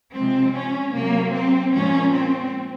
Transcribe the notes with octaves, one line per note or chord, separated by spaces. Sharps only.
C3 F3 G#3 C4
C#4
C3 F#3 A#3
C4
A#2 F3 G#3 C#4
C4